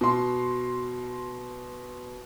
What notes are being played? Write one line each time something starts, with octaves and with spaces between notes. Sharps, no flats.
B2 C6